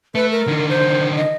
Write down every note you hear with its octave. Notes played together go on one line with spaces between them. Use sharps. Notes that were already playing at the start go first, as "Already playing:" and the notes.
A3 B4
A#4
D3 D#3
C5
D#5